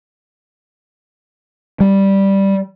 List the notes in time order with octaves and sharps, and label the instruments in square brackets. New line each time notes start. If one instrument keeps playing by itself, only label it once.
[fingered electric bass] G3